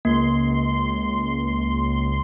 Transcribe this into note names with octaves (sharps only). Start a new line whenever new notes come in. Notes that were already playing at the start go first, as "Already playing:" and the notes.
C#2 A#3 C6